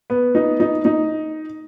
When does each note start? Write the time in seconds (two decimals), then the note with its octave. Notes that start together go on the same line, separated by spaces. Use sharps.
0.10 B3
0.35 D#4
0.60 D#4
0.85 D#4